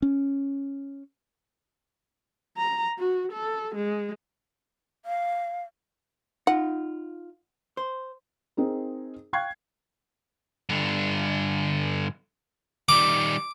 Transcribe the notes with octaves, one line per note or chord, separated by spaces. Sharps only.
C#4
A#5
F#4
A4
G#3
F5
D#4 F4 F#5
C5
C4 D#4 G#4 A#4
F5 G5 C#6 F#6 G#6 C7
G2 D3
D#3 G3 D6